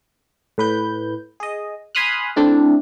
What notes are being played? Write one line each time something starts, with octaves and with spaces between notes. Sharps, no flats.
A2 B4 G6
G#4 D#5
G#5 B5 C6 D#6 F6 F#6
A3 C4 D4 E4